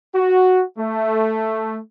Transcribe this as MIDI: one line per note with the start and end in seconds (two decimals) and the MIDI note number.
0.15 0.62 66
0.78 1.78 57